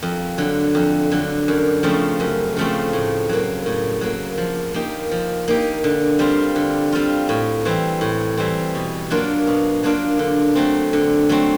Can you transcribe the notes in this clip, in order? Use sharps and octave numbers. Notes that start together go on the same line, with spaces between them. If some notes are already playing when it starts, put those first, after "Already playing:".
F2
D3 F#3
F2
D3 F#3
F#2
C#3 F3 A3 C4
F#2
C#3 F3 A3 C4
A2
F#3 A#3
A2
F#3 A#3
F3
A#3 D#4 G4
F3
A#3 D#4 G4
D3
G3 C4 F4
D3
G3 C4 F4
A2
E3 G3 C4
A2
E3 G3 C4
B2
F#3 A#3 D4 F4
B2
F#3 A#3 D4 F4
D3
F#3 A3 C4
D3
F#3 A3 C4